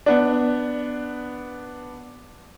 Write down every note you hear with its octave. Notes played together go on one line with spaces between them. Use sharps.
B3 D4